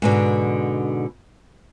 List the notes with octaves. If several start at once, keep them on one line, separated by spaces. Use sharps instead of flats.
G#2 B2 D3